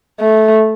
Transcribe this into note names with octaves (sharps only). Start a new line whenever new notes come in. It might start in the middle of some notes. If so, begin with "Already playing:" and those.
A3